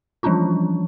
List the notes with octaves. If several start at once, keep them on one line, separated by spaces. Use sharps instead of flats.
E3 F3 G3 C#4 D4 F4